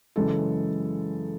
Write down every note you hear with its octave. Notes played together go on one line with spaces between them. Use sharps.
F#2 C#3 E3 G#3 A4